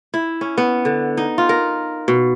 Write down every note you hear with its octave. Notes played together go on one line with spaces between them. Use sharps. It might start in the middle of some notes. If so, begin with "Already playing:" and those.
E4
C#4
B3
D3
D#4
F4
A#4
B2